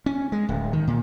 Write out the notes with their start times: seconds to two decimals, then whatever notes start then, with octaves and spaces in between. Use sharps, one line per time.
0.06 C#4
0.32 G#3
0.49 D1
0.73 D#3
0.87 A#2